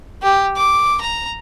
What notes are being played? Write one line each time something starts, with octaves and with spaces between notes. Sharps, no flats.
G4
D6
A#5